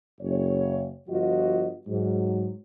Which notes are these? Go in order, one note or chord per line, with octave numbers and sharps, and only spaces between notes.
F#1 C#5
G1 F3 F4 F#4 D#5
G#2 F#3